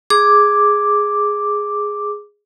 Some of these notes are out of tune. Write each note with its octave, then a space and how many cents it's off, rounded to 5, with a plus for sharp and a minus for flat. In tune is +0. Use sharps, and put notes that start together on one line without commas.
G#4 +0 D6 +0